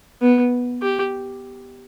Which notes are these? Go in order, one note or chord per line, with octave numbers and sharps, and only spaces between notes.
B3
G4